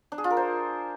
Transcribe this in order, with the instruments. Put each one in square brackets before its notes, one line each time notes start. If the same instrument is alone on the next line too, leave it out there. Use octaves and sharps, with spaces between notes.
[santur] D4
G#4
F4
A#4
C5